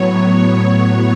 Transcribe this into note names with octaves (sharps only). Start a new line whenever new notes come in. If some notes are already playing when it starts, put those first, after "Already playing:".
Already playing: A2 F#3 B3 C#5
C#5